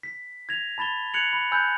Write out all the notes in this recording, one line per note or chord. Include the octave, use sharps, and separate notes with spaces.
B6
G#6 A#6 F7
A5 B5 A6 F7 G7
F#6 G#6 C#7 F7 F#7
B5
G#5 B5 E6 F#6 G6